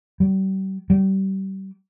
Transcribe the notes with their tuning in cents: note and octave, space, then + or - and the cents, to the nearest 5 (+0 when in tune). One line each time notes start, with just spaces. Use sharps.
G3 -40
G3 -30